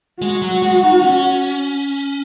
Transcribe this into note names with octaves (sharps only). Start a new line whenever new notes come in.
G#3 F#4
F#3
G#3
D#4
C#4